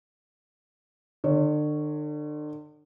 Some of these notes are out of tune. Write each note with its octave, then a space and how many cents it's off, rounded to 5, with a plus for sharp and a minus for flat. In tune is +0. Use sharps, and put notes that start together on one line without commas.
D3 +40 C#5 +0